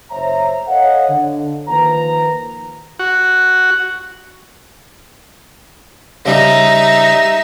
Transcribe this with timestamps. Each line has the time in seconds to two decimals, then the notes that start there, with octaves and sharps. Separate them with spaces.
0.11 F#1 C5 C#5 E5 A#5
0.68 A4 C#5 D#5 F5 F#5
1.09 D3
1.69 D#3 F3 A#3 B4 A#5
2.99 F#4
6.26 C#3 G3 D#4 E5